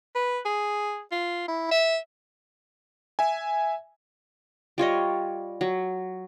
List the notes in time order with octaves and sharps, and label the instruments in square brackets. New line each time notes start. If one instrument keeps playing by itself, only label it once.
[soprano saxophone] B4
G#4
F4
E4
E5
[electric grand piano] E5 G#5
[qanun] G3 F4 C#5 D#5
F#3